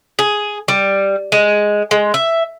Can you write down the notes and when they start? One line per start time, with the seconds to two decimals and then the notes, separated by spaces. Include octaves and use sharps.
0.19 G#4
0.68 G3
1.32 G#3
1.91 G#3
2.14 E5